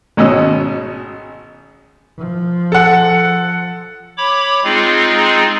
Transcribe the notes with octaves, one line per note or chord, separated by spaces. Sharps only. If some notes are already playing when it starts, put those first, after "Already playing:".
G#1 B2 C#4 D#5 E6
F3
A4 F#5
C#5 B5 D6
G#3 C4 D#4 F4 G#4